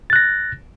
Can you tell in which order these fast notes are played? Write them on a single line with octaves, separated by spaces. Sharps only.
A6 F#6 A#6